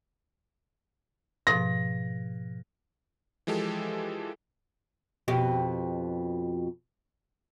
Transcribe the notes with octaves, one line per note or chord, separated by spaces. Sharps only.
G#2 B2 F3 A#6
E3 F3 G#3 G4 A4
F2 B2 G4